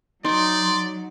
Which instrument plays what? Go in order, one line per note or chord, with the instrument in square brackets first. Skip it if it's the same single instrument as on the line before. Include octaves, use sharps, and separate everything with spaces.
[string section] F#3 [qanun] D#4 [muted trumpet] D5 [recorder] C6